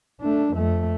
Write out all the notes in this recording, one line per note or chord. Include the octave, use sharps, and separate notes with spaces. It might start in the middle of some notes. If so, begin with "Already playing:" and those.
A3 D4
F2 A3